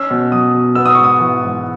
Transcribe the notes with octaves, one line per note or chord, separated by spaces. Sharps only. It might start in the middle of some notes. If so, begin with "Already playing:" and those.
Already playing: C#4 E6
B2
F#3 D#6
B2
B3 E6
D#6
G#2 C#6
D#6
E3
G#2